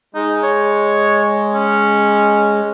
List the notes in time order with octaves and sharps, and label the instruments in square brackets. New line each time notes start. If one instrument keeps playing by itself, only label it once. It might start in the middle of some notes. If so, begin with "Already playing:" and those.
[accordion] G#3 [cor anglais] D#4
[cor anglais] C#5
C#4